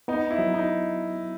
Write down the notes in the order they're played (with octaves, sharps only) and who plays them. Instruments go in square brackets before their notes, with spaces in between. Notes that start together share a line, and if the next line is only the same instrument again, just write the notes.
[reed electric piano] B3 [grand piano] D#4
[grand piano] E4
[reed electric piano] F#3
[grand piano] D#4